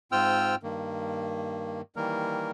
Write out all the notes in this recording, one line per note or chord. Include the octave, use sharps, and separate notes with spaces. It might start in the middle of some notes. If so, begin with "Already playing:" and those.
G#2 C4 F4 G5 E6 F6
G2 D#3 A#3
D#3 E3 G3 A#3 A#4